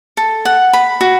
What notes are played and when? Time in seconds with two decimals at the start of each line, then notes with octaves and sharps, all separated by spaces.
0.17 A4
0.45 F#5
0.73 B5
1.01 F#4